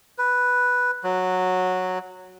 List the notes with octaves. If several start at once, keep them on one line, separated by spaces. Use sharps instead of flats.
B4
F#3